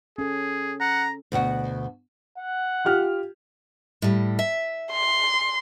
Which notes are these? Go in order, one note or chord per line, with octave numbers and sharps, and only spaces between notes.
C#4 G#4 A4
F#5 A#5
D2 B2 F#4 F#5
F#5
F4 G4 F6
A2 G3
E5
C6